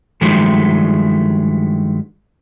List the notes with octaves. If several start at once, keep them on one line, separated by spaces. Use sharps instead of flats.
G2 D#3 F3 F#3 G#3 A3